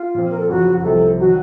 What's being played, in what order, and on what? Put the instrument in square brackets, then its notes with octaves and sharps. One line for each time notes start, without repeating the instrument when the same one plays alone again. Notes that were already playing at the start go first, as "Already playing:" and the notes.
Already playing: [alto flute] F4
[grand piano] A#2 F3 C4
[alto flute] A#4
A4
[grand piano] F#1 F2 C#3 F#3 [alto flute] F#4
[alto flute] F#4
[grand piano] C2 C3 F3 [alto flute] A4
[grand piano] D#3 F#3 [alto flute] F#4